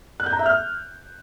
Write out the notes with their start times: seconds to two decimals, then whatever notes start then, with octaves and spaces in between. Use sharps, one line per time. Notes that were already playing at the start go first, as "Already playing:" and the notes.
0.20 F#6
0.26 G6
0.33 A#5
0.39 E5
0.46 F6